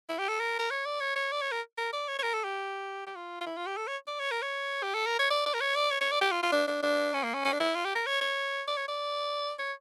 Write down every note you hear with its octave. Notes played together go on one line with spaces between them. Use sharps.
E4
G4
A4
A#4
A#4
C#5
D5
C#5
C#5
D5
C#5
A#4
A#4
D5
C#5
C#5
A#4
A4
G4
G4
F4
F4
E4
F4
G4
A4
C#5
D5
C#5
A#4
C#5
G4
A4
A#4
C#5
D5
D5
A#4
C#5
D5
C#5
C#5
D5
G4
F4
F4
D4
D4
D4
C#4
A#3
C#4
C#4
D4
E4
F4
G4
A#4
C#5
C#5
D5
C#5
D5
C#5